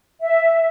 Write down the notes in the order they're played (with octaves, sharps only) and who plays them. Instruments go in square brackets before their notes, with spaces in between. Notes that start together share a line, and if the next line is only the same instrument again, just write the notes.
[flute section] E5